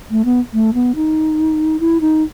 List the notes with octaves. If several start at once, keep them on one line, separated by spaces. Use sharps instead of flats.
A3
B3
A3
B3
D#4
E4
D#4